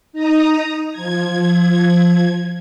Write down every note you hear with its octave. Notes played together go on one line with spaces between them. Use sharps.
D#4 A#5 D#6
F3 G#6